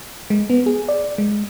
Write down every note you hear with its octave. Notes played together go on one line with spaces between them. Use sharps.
G#3
B3
G#4
D5
G#3